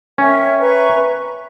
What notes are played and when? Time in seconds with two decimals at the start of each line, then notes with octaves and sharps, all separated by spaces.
0.18 C#4 A#4 C#5 E5 G5
0.58 B4 E5 A#5 C#6